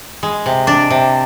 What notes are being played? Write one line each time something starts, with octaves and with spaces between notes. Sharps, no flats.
G#3
C3
D4
C3